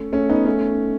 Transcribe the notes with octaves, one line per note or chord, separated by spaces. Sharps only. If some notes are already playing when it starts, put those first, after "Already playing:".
Already playing: A3 C#4
A3 C#4
B3 D#4
A3 C#4